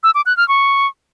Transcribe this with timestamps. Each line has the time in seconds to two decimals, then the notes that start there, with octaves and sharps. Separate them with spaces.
0.03 E6
0.15 D6
0.26 F#6
0.37 F6
0.48 C#6